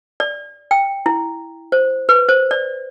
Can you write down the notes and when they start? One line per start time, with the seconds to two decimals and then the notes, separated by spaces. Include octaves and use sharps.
0.20 D5
0.71 G5
1.06 E4
1.72 C5
2.09 B4
2.29 C5
2.51 D5